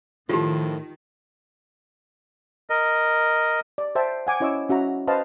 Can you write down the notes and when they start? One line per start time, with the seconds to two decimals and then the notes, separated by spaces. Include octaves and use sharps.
0.29 A2 D#3 F3 F4 G4
2.70 A#4 D#5
3.78 D5
3.95 C5 E5 G5 A5
4.27 F#5 G#5 D6
4.40 C#4 E4 C#5 D#5 D6 E6
4.69 C#4 F#4 E5 A#5
5.07 B4 C5 D#5 F5 A5